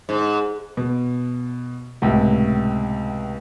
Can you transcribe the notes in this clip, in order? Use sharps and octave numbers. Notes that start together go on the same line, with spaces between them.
G#2
B2
C#2 A2 C3